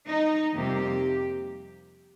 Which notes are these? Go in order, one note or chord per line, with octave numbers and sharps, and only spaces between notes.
D#4
F2 C3 G3 A#3 G4